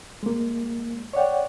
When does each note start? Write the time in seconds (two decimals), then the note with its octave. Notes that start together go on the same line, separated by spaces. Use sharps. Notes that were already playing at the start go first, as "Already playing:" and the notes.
0.23 G#3 A#3
1.13 C#5 D5 F#5 G5